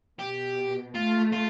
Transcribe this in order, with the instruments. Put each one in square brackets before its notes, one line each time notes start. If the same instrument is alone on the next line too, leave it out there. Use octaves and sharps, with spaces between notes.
[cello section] B2 [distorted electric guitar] G4
[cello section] A3 [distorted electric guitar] F4
[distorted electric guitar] F4